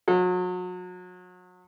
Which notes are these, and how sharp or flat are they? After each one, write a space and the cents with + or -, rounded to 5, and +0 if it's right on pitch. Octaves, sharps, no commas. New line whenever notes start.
F#3 -35